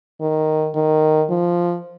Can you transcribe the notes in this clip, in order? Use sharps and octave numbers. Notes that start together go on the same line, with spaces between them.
D#3
D#3
F3